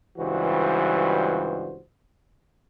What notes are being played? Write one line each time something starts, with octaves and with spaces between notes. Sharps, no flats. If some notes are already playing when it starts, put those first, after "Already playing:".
C#2 G2 E3 G3 F#4 C5